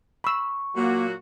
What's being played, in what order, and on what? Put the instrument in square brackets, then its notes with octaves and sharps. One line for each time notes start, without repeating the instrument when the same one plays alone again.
[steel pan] B5 E6 [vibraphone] C#6
[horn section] A#2 F#3 F#4 [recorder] A#3